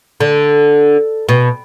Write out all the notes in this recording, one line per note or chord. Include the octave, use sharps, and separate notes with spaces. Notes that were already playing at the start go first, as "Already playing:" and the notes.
D3
B2